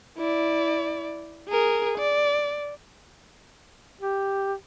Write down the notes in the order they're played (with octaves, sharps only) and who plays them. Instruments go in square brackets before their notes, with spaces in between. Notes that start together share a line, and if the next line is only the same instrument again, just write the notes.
[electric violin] E4 D5
G#4 A#4
D5
[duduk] G4